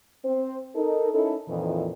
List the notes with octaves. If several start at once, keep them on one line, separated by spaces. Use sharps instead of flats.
C4 C5
D#4 A4 A#4
C#4 D#4 E4 A4
F2 A#2 D#3 E3